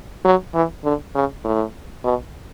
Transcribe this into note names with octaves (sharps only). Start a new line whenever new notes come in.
F#3
E3
D3
C#3
A2
B2